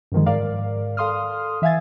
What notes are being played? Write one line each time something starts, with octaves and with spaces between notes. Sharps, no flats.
G2 D3 D#3 F3 G#3
G#2 A#4 D5 F5
A4 F5 C6 D#6 F6
E3 E5 F5 G#5 G#6 A6